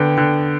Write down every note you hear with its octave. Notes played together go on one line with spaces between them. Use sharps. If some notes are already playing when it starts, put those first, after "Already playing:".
Already playing: D3 B3 G5
D3